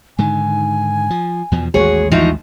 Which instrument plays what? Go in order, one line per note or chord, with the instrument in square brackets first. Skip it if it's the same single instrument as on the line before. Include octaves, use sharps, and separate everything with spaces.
[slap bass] G#2 D3 D#3 [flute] G#5
[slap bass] F3
E2 B2 F3
[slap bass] A1 D#2 G#3 [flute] F#4 [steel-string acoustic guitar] G#4 C#5
[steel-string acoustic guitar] E3 F3 D#4 [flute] F#4